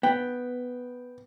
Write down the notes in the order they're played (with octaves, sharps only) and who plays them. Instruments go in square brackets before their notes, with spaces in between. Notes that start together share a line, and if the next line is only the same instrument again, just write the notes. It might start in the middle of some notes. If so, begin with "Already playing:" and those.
[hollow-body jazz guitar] B3 [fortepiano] G5